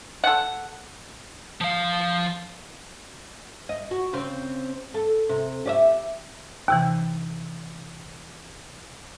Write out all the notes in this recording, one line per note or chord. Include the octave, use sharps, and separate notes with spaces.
A4 F#5
F3 F5
D#5
F#4
C#3 C4
A4
C3
G4 D5 E5
D#2 C3 E3